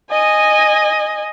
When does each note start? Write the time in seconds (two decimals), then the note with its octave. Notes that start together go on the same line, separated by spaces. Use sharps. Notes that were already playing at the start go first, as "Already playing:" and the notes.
0.11 D#5 G#5